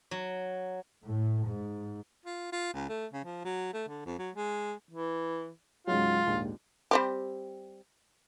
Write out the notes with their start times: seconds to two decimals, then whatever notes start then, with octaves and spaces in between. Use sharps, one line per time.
0.11 F#3
1.04 A2
1.46 G#2
2.26 F4
2.52 F4
2.74 C#2
2.89 A3
3.13 C#3
3.25 F3
3.45 F#3
3.74 A3
3.89 D3
4.06 F2
4.19 F#3
4.36 G#3
4.91 E3
5.87 C#2 G#2 F#3 F4
6.26 A#1 D#2 G#2
6.91 G3 C4 G4